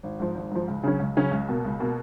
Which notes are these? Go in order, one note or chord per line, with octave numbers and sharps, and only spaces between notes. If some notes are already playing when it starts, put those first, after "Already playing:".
G#1
G#2 F3
G#1
G#2 F3
C#2
C#3 F#3 C#4
C#2
C#3 F#3 C#4
C#2
B2 A#3
C#2
B2 A#3